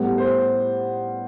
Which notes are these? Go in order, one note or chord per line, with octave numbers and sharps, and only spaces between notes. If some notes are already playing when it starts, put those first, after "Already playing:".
Already playing: A2 G3 B3
C5